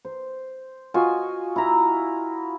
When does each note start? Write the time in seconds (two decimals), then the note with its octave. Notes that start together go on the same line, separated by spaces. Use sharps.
0.05 C5
0.94 F4 F#4 D#5 G#5
1.56 E4 A#5